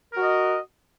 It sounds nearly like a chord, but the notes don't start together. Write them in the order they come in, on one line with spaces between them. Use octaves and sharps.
A#4 F#4 D#5